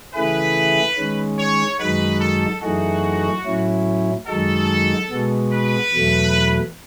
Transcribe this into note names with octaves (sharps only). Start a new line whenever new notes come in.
C#3 E3 A3 E4 G#4 B4
D#3 G#3 C#4
C#5
F#2 D#3 G#3 D#4 F#4 B4
A4
F#2 E3 A3 D#4 F#4 G#4
A2 F#3 C#4 E4
F#2 D#3 G#3 D#4 F#4 A4
B2 G#3 B3 F#4
B4
E2 B2 F#3 A3